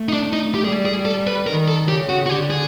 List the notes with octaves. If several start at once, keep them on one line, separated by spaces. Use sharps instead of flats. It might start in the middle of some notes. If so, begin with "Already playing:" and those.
Already playing: A3
D#4
D4
D#4
G4
G3 G#4
G#4
A4
B4
D#3 A#4
A4
C#3 G4
F#4
F#4
D3 G4
G#4